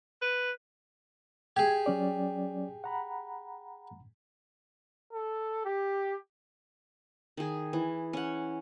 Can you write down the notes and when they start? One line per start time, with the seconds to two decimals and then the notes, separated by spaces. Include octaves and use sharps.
0.22 B4
1.56 G4 G#4 G#6
1.86 F#3 C#4 D5
2.84 F#5 A#5 B5
5.13 A4
5.65 G4
7.37 D#3 G#4
7.73 E3
8.13 C#4 F#5